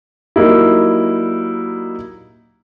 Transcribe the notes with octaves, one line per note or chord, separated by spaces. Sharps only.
F#3 G3 A#3 D#4 E4